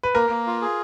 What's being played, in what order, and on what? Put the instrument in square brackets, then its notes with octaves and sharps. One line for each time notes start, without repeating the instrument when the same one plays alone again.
[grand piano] B4
[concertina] A#3 [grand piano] A#4
[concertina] A#3
F4
G#4